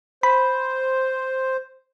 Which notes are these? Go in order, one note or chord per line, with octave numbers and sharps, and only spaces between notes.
C5 B5